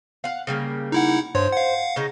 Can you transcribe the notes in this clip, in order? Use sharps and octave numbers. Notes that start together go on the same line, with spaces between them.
F5 F#5
C#3 G3 A#3
D#4 E4 F#5
G2 C5 C#5
F5 F#5
C#3 D#4